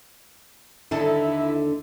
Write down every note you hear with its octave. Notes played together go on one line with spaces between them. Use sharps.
D#2 D3 E4 A4